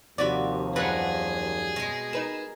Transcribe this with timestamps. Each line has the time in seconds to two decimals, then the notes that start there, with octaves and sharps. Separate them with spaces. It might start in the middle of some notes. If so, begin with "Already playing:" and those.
0.18 D#2 C3 F3 F#4 D5 B5
0.76 F#2 F#3 G3 G#4 B4 F#5
1.76 B2 G#3
2.13 D#4 A#4 B4 E7